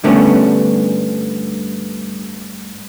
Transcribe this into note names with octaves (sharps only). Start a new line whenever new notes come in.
G2 D3 A3 B3 C#4 D4